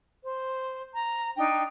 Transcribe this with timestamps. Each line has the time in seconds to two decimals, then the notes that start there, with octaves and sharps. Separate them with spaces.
0.23 C5
0.95 A#5
1.37 D4 D#4 G5